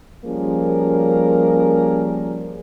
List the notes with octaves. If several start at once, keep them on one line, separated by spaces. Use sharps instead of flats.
F3 G3 A#3 C#4 G#4 A#4